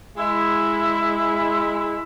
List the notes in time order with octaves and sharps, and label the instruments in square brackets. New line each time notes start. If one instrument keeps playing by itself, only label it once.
[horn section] G#3 E4